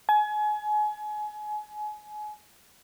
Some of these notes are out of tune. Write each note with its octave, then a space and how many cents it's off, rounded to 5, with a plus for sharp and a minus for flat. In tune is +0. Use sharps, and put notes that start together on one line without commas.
G#5 +30